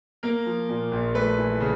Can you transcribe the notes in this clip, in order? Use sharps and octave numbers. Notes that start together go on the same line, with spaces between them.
A#3 A#4
F3
A#2
A#1
A3 B4
E3
C#3